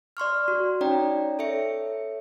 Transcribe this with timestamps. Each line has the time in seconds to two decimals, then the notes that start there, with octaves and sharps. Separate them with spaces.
0.17 D5 C6 C#6 F6
0.48 F#4
0.81 C#4 D#4 C#5 D5 G5 A#5
1.39 A4 C#5 E5 C#7